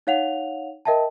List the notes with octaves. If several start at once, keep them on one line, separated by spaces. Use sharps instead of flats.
D#4 C#5 F5 F#5 F7
A#4 D#5 E5 G5 A5